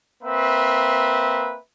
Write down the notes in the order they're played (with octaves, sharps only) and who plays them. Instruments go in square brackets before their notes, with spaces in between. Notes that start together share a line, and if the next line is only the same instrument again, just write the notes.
[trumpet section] A#3 C4 B4 E5